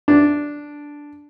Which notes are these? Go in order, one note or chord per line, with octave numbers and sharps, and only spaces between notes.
D4